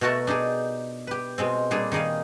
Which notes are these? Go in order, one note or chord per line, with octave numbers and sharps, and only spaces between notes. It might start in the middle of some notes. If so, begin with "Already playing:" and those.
B2 A3 F#4 A#4 A5
D4 D#4 G4 G#4
G4 B4
B2 G#3 C4
A#2 G3 D4 G#4
D#3 D#4 G#4 D#5 F5